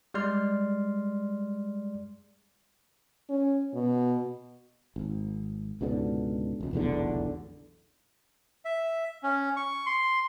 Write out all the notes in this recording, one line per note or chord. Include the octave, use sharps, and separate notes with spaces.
G3 G#3 D5 C6 F6
C#4
B2
G#1
C#2 G#2 B2 D3
E1 C#2
F1 B1 E2 D3
E5
C#4
C#6
C6